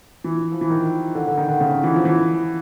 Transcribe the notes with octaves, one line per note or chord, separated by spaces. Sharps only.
E3
F3
E3
D#3
D3
D3
D#3
D3
C#3
E3
F3
E3